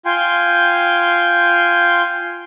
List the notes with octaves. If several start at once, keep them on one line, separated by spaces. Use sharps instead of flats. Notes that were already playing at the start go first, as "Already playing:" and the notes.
F4 G5 G#5 C6